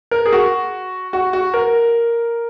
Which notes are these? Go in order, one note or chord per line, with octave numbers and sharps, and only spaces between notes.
A#4
G#4
F#4
F#4
F#4
A#4